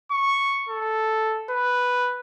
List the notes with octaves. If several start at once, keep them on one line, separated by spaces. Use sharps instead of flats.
C#6
A4
B4